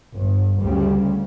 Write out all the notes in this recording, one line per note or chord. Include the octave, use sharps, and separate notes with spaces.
G1 G2
D2 C#3 G3